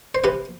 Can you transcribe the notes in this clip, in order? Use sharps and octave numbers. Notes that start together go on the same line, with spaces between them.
C5
C3 G4 B4